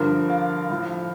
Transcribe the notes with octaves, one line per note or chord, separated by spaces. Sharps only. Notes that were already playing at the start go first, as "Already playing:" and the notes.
Already playing: G2 D3 F3 A#4
F5
A2 F3